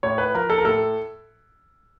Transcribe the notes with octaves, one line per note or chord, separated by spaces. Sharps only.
A2 C#5
B4
F3 A#4
A4
A#4
A2 A4